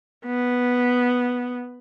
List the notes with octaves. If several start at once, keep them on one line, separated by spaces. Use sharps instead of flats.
B3